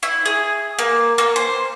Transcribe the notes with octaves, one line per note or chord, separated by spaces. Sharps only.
E4
G#4
A#3
A#3
C5